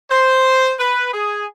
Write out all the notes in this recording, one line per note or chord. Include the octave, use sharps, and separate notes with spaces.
C5
B4
G#4